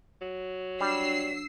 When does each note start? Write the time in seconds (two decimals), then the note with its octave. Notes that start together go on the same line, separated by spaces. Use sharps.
0.21 F#3
0.81 G3 D4 E6 C7